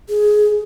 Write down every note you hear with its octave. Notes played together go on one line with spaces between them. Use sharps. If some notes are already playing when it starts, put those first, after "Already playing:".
G#4